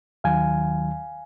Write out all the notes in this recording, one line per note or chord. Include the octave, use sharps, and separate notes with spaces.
D#2 D#3 F#3 F5 G#5